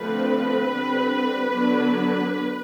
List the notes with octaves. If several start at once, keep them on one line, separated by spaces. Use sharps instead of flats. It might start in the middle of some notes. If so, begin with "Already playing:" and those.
Already playing: D3 F3 A3 C4 B4
D3 G3 C4
D3 F#3 B3 D4